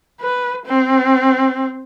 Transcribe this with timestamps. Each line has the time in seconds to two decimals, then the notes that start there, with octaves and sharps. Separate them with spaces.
0.20 B4
0.66 C4